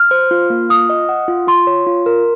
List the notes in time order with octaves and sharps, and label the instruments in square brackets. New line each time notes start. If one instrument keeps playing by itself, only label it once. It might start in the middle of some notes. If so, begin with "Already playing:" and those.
Already playing: [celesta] F6
[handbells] C5
F4
A#3
[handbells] F4 [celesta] D#6
[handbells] D#5
F#5
F4
[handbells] F4 [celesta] C6
[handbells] C#5
F4
A#4